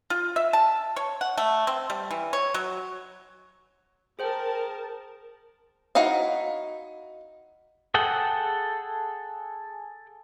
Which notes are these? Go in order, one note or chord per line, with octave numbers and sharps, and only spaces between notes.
F4
E5
A5
C#5
F#5
A3
C4
G3
E3
C#5
F#3
G#4 A#4 C5 G5 A5
D#4 E4 F#4 F5
G#4 A4 F#5 G5